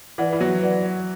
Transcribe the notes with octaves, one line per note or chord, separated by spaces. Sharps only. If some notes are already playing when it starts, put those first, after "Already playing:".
E3 B4 D5 F#5
E3
F#3
B4 D5 F#5